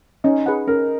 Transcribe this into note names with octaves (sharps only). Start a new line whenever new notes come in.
C#4 D#4
G#4 B4 F#5
C#4 A#4